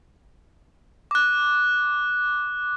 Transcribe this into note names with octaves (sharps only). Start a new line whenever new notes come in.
D6 F#6